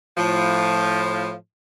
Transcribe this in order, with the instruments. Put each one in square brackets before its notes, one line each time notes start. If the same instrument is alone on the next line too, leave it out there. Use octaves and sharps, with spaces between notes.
[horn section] A2 F3